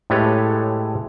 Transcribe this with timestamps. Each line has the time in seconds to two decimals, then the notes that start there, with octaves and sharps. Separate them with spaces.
0.10 A2 G#3 G4 A4 B4 C#5